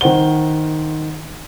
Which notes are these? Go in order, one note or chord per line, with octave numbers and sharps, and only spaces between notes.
D#3 C5 F#5 G7